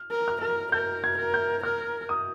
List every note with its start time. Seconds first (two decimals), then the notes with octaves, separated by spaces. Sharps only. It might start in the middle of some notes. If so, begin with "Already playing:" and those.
Already playing: F6
0.11 A#4
0.28 F6
0.42 A#4
0.72 A#4 G6
1.04 G#6
1.18 A#4
1.34 G6
1.63 A#4 F6
2.09 D#6